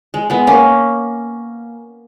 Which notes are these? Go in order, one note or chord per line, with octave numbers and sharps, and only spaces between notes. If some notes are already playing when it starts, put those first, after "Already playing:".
G#3
G#3 B3
A#3 C#4